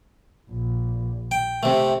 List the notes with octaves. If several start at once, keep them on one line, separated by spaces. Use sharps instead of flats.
A#1
G5
C3 A3 C4